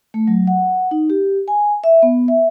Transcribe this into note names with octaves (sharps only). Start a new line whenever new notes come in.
A3
F#3
F#5
D#4
G4
G#5
E5
B3
E5